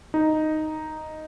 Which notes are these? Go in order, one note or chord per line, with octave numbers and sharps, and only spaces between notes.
D#4